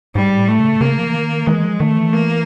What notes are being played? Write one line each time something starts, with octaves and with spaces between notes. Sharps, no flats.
G#2 G3
A2
A3
C#3
C#3 A#3
F3
E3
D#3
E3 G#3
F3
D#3 A3
E3
A#3